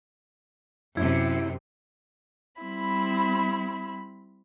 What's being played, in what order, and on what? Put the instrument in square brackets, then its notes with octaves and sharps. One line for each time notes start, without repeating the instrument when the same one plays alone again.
[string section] F#2 C3 [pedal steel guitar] E4
[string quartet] G3 C4 E4 B5